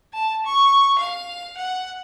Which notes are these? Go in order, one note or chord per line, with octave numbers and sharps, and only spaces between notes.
A5
C#6
F5
F#5